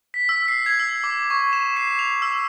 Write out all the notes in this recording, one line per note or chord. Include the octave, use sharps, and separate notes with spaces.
B6
E6
C7
G#6
E6
D6
C#6
E7
C7
F7
E6